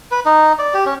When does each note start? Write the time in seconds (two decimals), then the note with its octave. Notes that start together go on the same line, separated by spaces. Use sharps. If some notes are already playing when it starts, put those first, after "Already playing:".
0.11 B4
0.26 D#4
0.59 D5
0.74 G4
0.86 C#4